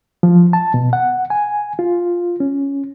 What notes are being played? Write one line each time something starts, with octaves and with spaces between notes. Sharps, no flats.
F3
A5
B2
F#5
G#5
F4
C#4